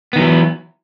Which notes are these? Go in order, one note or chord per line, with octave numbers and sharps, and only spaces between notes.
D#3 E3 F#3 B3